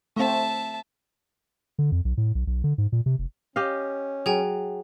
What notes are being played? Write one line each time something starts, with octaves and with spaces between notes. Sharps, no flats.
A3 C4 E5 A5
D3
F2
B1
A2
B1
B1
D3
G#2
A#2
C3
F1
C#4 G4 D#5 F5
F#3 G#4 G5 G#5